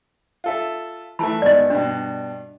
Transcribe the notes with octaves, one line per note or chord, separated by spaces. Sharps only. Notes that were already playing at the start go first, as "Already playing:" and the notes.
F4 A4 E5
E3 A3 E4 A5 B5
G#1 B3 D5 D#5
G2 B2 D4